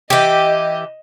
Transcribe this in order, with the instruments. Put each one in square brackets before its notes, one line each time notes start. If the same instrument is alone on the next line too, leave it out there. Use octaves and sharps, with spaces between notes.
[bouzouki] E3 G4 [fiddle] D#5